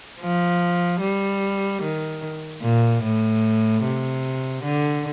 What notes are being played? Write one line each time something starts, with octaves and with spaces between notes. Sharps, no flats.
F3
G3
D#3
A#2
A2
C3
D3